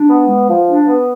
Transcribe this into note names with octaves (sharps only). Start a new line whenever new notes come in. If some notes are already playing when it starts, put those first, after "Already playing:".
Already playing: D4
B3
G#3
F3
D4
B3